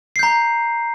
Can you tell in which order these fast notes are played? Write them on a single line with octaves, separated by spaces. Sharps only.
C7 G6 A#5